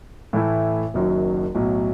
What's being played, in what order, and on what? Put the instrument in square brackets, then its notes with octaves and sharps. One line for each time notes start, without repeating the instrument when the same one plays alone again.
[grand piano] A2 E3 A3 E4
F#1 F#2 D#3 F#3
B1 A2 F#3